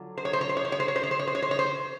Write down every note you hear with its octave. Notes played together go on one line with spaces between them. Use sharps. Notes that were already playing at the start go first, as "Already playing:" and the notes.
Already playing: D3 F#3 F4
C5
C#5
C5
C#5
C5
C#5
C5
C#5
C5
C#5
C5
C#5
C5
C#5
C5
C#5
C5
C#5
C5